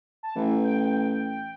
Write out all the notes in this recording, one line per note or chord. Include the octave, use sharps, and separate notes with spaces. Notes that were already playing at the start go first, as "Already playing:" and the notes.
A5
A1 E3
G5